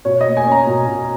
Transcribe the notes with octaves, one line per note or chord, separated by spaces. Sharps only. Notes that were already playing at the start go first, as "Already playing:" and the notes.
B2 C#5
D#5
A#3
G#5
C#4
A#5
B2
B2